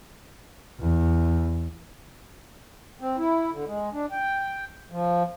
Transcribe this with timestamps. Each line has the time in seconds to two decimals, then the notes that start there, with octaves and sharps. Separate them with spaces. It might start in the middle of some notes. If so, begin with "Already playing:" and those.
0.80 E2
3.00 C4
3.17 E4
3.52 D3
3.66 G#3
3.93 D4
4.12 G5
4.91 F3